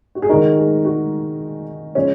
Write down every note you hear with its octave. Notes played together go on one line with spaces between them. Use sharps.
F#4
G#4
D#3 G#3 D#4 F#4 A#4
G#4
F#4
F3 G#3 C#4 G#4